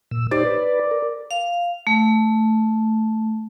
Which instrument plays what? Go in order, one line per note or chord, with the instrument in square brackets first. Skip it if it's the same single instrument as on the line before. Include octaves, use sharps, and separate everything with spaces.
[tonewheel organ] A#2 E6
[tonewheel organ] D#4 G4 C5 [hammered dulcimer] D5
[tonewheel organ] B4
A#4
[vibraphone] F5
A3